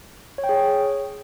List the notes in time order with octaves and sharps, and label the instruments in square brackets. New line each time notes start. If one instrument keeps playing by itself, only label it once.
[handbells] C#5
G5
G#4
C#5